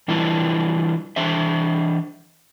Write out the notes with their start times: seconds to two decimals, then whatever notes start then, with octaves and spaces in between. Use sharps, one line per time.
0.08 E3 G3 D4 E4 F4 B4
1.16 E3 D4 C5 E5